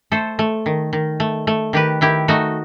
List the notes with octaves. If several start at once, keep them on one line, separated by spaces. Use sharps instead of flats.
A3 A4 C5
A3
D#3
D#3
A3
A3
D#3 G4 B4
D#3 E4 G4
A3 D#4 F#4